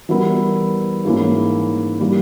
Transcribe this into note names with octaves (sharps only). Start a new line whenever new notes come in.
E3 G3 B3 E4 A#4
G#2 E3 A#3 C#4 E4
E3 G3 A#3